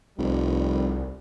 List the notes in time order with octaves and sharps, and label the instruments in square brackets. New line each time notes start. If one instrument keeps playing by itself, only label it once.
[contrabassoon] F1 [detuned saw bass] C2 [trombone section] G3